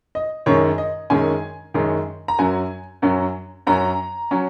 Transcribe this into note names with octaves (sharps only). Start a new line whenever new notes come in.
D#5
F#2 D#3 G#3 C#4 C#5
D#5
F#2 D#3 G#3 C#4 G#5
F#2 D#3 G#3 C#4
A#5
F#2 F#3 C#4 G#5
F#2 F#3 C#4
F#2 F#3 C#4 A#5
F#3 C#4